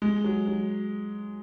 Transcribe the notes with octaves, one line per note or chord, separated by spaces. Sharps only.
G#3
F#3
F#3